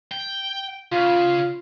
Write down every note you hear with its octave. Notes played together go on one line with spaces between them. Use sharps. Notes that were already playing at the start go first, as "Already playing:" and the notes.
G5
C#3 F4